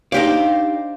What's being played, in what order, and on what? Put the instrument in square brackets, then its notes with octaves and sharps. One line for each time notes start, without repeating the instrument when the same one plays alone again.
[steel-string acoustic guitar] D4 C5 F5 [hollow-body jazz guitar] D#4 G4 D5